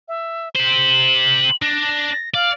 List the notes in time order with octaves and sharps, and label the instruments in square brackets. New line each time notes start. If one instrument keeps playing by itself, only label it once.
[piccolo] E5
[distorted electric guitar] G4 C5 [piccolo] F#7
[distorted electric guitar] D4 [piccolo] A#6
[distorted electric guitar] D5 [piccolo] F5